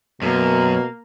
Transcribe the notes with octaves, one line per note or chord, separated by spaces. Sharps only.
F#2 B2 A#3